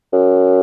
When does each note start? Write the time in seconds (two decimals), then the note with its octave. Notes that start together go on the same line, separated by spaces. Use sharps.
0.13 F#2